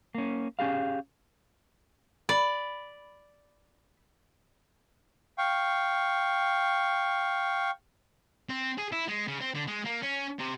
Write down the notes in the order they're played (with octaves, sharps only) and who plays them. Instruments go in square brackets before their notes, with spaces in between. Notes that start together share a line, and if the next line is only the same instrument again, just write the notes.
[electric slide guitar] A#3 C#4
C#4 G4 G#4 F5
[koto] D5 [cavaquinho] B5
[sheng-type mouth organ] F5 G5 C#6
[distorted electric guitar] C4
G#4
E4
G#3
C#3
C4
D3
G#3
A#3
C#4
C3